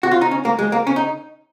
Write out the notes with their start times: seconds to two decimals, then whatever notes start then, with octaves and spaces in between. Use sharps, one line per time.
0.03 F#4
0.11 F4
0.21 D#4
0.31 C#4
0.45 A#3
0.59 G#3
0.72 A#3
0.87 C#4
0.96 D#4